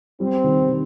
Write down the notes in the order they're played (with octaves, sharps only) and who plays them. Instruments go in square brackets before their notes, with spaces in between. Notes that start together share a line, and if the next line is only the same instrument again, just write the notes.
[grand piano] G3 [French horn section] C4
[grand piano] D#3
D#3